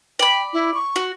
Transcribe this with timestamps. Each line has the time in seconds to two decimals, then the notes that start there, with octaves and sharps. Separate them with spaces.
0.19 D5 G5 B5
0.53 E4
0.74 C#6
0.96 F#4